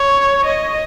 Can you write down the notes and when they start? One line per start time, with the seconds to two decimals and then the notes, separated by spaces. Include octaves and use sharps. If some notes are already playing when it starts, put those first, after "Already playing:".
Already playing: C#5
0.45 D#5